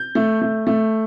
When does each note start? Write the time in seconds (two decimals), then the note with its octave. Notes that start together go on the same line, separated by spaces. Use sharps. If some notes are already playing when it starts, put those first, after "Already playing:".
Already playing: G6
0.15 A3
0.41 A3
0.67 A3